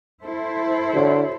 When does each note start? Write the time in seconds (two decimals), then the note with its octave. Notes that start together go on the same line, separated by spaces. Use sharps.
0.24 E4 A4 C5
0.94 D3 F#4 C#5